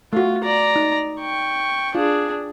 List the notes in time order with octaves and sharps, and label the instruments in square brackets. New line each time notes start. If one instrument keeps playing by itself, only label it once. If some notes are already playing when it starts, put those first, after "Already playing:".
[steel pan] A3 F#4 [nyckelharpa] F4
[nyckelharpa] D5 A#5
[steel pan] D#4
[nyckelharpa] G5 C#6
[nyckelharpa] D4 G#4 [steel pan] F4